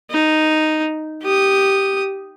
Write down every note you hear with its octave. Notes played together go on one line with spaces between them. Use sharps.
D#4
G4 D#6